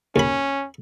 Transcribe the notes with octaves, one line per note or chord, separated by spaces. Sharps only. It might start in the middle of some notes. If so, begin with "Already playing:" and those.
D#2 C#4 B5